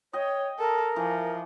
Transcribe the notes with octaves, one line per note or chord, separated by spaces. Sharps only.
C#5 D#5 G5
A4 A#4
E3 F3